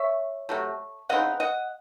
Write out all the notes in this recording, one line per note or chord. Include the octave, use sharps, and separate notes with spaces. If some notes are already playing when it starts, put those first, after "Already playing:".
Already playing: C#5 E5
C3 F#3 A3
C#3 E3 C4 D#4 D#5 F#5
D#5 F#5